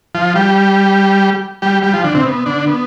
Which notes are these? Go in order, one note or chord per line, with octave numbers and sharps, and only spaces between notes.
F3 F4
G3 G4
G3 G4
G3 G4
F3 F4
D3 D4
C3 C4
B3
D3 D4
B3